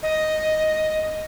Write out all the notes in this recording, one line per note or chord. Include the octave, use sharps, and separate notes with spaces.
D#5